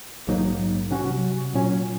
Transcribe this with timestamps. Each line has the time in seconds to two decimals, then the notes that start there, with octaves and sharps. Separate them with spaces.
0.27 A#1 G#2 F#3 A#3 D#4
0.91 C3 F#3 C#4 F#4
1.54 A#2 F#3 C#4